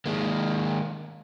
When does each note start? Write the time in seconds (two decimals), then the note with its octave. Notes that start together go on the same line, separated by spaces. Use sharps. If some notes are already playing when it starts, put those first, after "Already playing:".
0.06 D#3 G#3 A#3